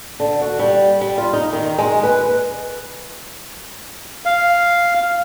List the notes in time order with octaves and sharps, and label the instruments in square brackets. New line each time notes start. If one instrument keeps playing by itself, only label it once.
[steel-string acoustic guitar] D3
F#4
G3
G3
F4
D#4
D#3
G#3
B4
[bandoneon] F5